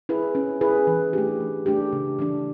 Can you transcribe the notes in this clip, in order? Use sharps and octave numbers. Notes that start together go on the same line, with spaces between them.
E4 G#4 B4
C#4
E4 G#4 B4
E3
A3 D4 G4
E3
A3 D4 G4
C#3
E3 A3 D4